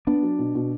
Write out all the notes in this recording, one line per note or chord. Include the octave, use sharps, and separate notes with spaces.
B3 D4
F#3
B2
B2